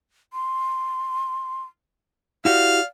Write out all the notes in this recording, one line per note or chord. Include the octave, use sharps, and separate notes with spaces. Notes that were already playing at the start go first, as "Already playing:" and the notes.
C6
E4 F#4 G4 D5 F5